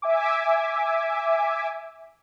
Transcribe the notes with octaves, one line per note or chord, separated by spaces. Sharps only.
E5 G#5 D6